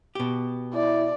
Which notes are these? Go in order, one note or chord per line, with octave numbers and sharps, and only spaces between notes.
B2 G4
E4 D5